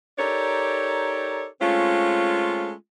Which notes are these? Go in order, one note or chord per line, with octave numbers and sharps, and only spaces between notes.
D#4 G4 A4 A#4 C#5 D5
G#3 A3 C4 C#4 F4